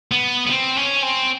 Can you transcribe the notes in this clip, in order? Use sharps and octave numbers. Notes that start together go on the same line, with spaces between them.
B3
B3
C4
C#4
C4